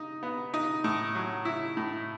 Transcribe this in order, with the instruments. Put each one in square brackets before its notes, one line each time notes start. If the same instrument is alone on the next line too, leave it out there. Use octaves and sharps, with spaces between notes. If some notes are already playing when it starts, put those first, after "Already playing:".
Already playing: [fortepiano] D#4
B3
D#4
A2
F#3
E4
A2